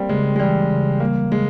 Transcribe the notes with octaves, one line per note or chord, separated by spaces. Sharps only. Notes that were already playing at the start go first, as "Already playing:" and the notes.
Already playing: G3 A#3 C4
C#3 G#3
G#3
E3 G3
C#3
G3 A#3
C#3 G#3